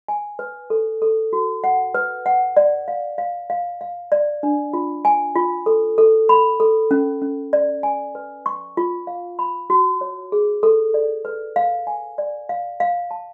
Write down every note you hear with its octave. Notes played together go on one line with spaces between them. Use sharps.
G#5
B4
A4
A4
F#4
F#5
B4
F#5
D5
F5
F5
F5
F5
D5
D4
F4
G#5
F4
A4
A4
B5
A4
C#4
C#4
D5
G#5
B4
C#6
F4
F5
B5
F#4
C#5
G#4
A4
D5
B4
F5
G#5
D5
F5
F5
A5